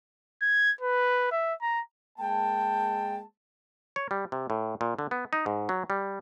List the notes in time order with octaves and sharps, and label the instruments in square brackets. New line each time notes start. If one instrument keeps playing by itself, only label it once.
[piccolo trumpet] G#6
B4
E5
A#5
[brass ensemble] G#3 A#3 A5 [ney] G5
[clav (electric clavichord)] C#5
G3
C3
A2
A#2
D3
B3
D#4
G#2
F#3
G3